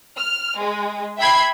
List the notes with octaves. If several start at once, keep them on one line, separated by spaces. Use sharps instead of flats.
F6
G#3
E5 G5 B5 G#6 C7